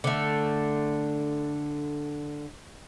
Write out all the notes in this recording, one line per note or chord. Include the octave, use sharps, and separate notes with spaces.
D3 A3